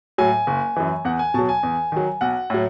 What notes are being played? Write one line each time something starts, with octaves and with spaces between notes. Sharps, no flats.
A2 F#3 G#5
F#1
F#2 E3
E2 F#5
G#5
B2 F#3 A5
G#5
E2
D#3 F#3
B1 F#5
A2 F#3